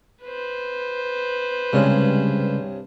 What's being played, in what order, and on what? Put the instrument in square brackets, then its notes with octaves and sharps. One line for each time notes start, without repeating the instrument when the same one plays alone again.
[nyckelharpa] B4 C5
[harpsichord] C2 G2 C#4 [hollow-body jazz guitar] C#3 G#3